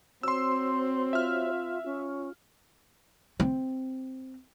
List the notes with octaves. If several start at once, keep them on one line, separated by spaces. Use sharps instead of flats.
C4 F#4 C5 C#5 C6 E6
F4 E5 F6
C#4 F4
C4